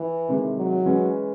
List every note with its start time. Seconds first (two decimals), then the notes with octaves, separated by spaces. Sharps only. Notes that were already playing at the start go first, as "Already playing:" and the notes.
Already playing: E3
0.28 C3 D#3 G#3
0.57 F#3
0.86 E3 G#3 C#4